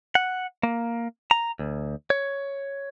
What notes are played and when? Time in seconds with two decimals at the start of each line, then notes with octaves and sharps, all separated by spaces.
0.15 F#5
0.63 A#3
1.31 A#5
1.59 D2
2.10 C#5